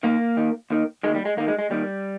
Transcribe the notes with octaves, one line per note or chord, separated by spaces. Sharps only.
D#2 D#3 A#3
D#2 D#3
D#2 D#3
D#3 G#3
D#2
G3
G#3
D#2 D#3 A#3
G#3
G#3
D#2 D#3 G3